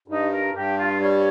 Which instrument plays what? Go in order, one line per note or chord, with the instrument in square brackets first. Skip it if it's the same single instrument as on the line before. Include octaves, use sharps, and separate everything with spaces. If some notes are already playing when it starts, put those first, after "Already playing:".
[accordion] G2 [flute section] D#4
[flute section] A#4
[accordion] G2 [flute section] G4
[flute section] F4
[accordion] G3 [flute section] C#5